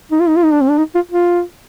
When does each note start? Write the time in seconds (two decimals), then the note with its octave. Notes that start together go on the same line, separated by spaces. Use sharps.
0.12 D#4
0.20 F4
0.28 D#4
0.37 F4
0.45 D#4
0.53 D4
0.61 C4
0.70 D4
0.78 D#4
0.95 F4
1.12 F4